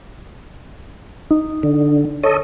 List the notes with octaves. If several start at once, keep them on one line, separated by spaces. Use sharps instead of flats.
D#4
D3
A4 C#5 D#5